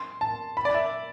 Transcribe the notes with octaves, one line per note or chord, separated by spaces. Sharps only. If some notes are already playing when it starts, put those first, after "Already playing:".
Already playing: C6
A5
B5
D5
E5